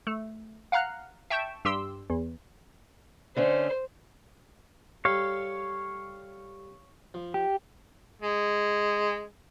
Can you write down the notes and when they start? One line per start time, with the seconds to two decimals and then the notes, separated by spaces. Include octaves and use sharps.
0.07 A3
0.72 F5 F#5 A#5 F6 F#6
1.30 E5 G5 A5 C#6 G6 E7
1.65 G2 G4 C6 E6
2.10 E2
3.37 D3 A3 C#4 C5
5.05 G3 A4 C#5 F5
7.14 F3
7.34 G4
8.22 G#3